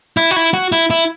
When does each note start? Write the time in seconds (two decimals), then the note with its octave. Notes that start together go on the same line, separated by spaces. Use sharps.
0.17 E4
0.31 F#4
0.36 E4
0.53 F#4
0.72 E4
0.90 E4